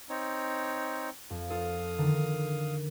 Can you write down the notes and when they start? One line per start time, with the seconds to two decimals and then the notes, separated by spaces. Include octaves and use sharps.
0.10 C4 D#4 C#5
1.30 F2
1.50 F4 A4 F5 D#6
1.98 D3 D#3